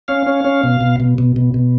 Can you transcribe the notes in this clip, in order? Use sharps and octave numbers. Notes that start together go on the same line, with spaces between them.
C#4 F5
C#4
C#4
B2
B2
B2
B2
B2
B2